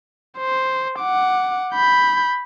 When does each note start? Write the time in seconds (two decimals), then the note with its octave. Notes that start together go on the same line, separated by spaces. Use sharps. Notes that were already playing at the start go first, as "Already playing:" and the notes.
0.38 C5
0.99 F#5 D6
1.73 B5 G6